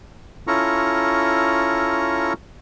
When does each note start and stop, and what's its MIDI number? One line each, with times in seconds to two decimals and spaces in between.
0.47 2.33 61
0.47 2.33 64
0.47 2.33 65
0.47 2.33 69
0.47 2.33 82
0.47 2.33 85